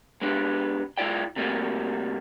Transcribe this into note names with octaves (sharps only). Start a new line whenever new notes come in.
G#3 B3 D4 G4
G#3 E4 F4 D5 G5
C3 G3 A3 A#3 F#4